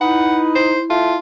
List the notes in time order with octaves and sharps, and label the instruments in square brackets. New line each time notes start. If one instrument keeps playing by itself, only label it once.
[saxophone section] D#4 [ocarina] E4 [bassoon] B4 [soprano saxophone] F#5
[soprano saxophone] C5
[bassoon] A3 [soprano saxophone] F4